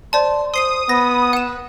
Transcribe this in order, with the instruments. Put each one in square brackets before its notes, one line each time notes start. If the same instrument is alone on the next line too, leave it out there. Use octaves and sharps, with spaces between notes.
[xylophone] C5 D5 A5 [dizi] C6
[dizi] C5 [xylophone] C6 C7 D#7 [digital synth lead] D#6
[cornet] B3 [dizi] B5 [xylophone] A#6
[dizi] B4 [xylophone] F#5 E7